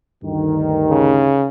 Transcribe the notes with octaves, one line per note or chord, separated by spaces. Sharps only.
D2 G2 D#3
C#3